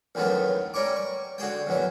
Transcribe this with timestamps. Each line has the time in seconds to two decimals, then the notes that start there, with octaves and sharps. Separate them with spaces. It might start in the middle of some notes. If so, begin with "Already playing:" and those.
0.15 A1 D#2 D#3 F#3 A3 B3
0.74 G3 C#4 A#4 C#6 D6
0.96 C#6
1.38 D3 F#4 G#4 G5
1.67 A#1 E2 F#3